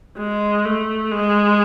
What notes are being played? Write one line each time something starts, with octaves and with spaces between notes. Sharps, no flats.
G#3
A3
G#3